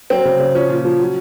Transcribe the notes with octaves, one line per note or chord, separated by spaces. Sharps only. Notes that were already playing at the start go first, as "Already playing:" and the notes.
F#3 C4
C#3
C#3
F3 C#4
A#2
F3
F#3